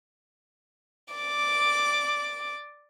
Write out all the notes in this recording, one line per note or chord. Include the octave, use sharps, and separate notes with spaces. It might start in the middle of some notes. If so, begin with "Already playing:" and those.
D5 D6